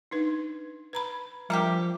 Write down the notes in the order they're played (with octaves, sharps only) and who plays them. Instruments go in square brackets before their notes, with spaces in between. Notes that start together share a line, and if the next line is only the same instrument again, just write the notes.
[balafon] D4 D#4 B4
B4 A#5 B5
[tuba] F3 [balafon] G3 [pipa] A#3 D4 G4